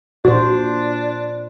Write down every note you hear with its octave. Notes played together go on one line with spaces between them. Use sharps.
A#2 D4 F#4 C5